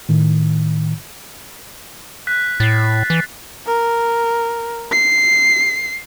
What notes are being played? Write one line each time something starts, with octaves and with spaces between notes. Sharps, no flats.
A2 D#3
F#6 B6
A2 A6 C7
E3
A#4
C7